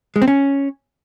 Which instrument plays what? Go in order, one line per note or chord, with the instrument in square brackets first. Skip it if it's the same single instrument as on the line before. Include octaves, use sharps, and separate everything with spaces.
[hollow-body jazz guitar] G#3
C4
C#4